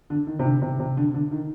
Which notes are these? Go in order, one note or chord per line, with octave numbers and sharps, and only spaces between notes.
D3
D#3
C3
D3
C3
C3
D3
D3
D#3